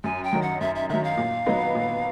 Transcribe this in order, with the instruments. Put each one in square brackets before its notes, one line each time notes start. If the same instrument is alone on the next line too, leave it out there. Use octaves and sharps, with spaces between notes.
[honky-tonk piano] F#2 [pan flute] G#5
[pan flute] G5
[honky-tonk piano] D#3 F#3
[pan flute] F#5
[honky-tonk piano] F#2 [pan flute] E5
[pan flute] E5
[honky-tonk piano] D#3 F#3 [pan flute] E5
[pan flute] F5
[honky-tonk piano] A#2
F#3 B3 D#4
A#2